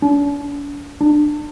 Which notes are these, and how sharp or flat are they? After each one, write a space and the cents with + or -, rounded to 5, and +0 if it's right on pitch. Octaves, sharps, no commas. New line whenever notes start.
D4 -45
D4 +20